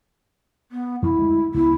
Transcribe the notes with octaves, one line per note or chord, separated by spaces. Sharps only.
B3
F2 D#3 E4
D2 G#3
C#2 B3 E4